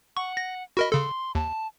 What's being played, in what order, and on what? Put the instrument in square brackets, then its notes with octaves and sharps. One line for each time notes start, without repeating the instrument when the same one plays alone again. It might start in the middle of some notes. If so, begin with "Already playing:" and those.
[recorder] F#5 [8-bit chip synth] C#6
[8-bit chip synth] A#6
[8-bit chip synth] F#4 A#4 D#5 [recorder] B5
[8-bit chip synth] C#3 A4 [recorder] C6
[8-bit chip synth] D#2 [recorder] A5